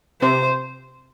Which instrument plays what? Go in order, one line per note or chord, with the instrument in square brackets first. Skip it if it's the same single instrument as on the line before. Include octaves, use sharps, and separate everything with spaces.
[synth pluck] C3 [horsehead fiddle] C5